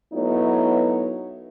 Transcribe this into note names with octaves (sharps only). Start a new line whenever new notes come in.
F#3 A3 B3 D#4 E4 C#5